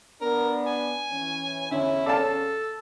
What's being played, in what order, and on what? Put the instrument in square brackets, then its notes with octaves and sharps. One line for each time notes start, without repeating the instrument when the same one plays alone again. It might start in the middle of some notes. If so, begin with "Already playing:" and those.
[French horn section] B3 D4 [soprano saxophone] A#4
[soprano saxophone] G#5
[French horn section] E3 C#4
[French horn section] E2 C#4 [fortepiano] D3 [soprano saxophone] E4
[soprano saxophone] A4 [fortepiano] D5 F5 A5